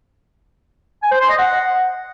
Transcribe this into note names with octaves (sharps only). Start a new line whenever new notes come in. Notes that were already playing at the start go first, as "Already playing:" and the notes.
G#5
C5
C6
D#5
F#5